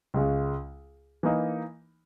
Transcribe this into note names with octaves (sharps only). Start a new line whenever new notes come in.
C#2 C#3 G#3
E3 A#3 D#4